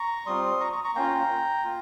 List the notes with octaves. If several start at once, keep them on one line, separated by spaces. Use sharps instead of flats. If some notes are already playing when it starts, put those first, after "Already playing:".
Already playing: A#5 C#6
G3 C4 F4 C6 D#6
A#5 C#6
A#5 C#6
A#5 C#6
A#3 C#4 F4 G5 A#5
A#3 F4